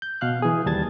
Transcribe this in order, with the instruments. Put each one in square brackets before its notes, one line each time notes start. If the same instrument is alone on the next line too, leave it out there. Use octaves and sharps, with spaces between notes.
[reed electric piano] G6
B2 F5 F#6
E3 G#4
D#2 G3 A5 G#6 A6